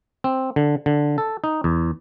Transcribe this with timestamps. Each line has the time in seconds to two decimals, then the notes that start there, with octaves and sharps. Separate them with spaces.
0.24 C4
0.56 D3
0.86 D3
1.18 A4
1.44 D#4
1.64 E2